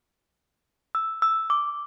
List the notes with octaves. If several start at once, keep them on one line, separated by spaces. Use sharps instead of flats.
E6
E6
D6